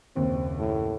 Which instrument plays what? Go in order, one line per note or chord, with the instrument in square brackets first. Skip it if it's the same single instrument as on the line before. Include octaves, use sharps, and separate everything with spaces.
[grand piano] F#1 D#2 [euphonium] C4
[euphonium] A2